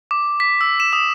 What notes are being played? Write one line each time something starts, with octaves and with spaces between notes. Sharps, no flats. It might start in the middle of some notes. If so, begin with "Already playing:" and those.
D6
B6
E6
E7
D#6